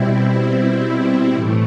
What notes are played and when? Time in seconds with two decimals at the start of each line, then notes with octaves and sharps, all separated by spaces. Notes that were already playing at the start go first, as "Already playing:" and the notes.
Already playing: B2 G3 C4 E4
0.32 C4 E4
1.32 A2 E3 A3